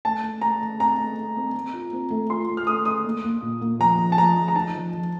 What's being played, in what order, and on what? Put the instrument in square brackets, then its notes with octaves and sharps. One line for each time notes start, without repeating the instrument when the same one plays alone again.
[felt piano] A3 [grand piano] A5
[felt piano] A3
[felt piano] A3 [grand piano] A#5
[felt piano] A3
[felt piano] C4 [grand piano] A#5
[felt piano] A3
A3
C4
C4
F4
C4
A3
[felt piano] F4 [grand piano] C6
[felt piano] A3
[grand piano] F6
[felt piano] A3 [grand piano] D#6
[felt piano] A3 [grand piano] D#6
[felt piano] A#3
A#3
A#2
A#3
[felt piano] F3 [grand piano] A#5
[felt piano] F3
[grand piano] A5
[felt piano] F3 [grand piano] A#5
[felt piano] F3
[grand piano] A#5
[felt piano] D#4 [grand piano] A5
[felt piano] F3
F3